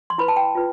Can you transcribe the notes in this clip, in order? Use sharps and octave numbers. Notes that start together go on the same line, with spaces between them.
C6
E4 B4 B5
A5
G5
F4 B4